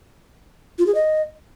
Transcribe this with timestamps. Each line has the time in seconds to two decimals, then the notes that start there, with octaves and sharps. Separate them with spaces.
0.79 F4
0.87 G#4
0.95 D#5